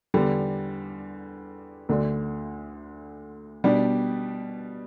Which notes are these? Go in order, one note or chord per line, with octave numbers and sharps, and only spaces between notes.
E2 D3 G3
D2 D3 A3
B2 G3 D4 G4